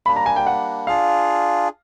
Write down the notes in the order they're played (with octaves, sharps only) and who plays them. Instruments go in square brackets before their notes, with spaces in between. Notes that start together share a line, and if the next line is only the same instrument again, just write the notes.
[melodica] G3 A#3 D4 [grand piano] B5
[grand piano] A#5
G#5
G5
F#5
[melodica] D4 F4 G#4 [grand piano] F5